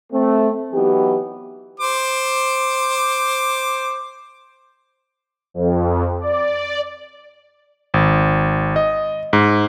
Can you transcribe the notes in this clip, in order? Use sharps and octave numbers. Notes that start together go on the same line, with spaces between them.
A3 C4
E3 F#3 B3 D#4 G4
C5 D6
F2
D5
G#1
D#5
G#2